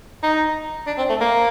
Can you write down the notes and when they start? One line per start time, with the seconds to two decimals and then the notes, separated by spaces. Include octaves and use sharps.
0.23 D#4
0.87 D4
0.98 C4
1.09 A3
1.20 A#3